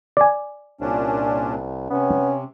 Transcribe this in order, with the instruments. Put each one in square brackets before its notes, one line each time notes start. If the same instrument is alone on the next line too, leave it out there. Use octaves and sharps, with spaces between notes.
[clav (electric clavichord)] D5 G#5
[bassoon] C2 [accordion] A#2 C#4 D4
[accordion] C3 [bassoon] B3 [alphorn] C#4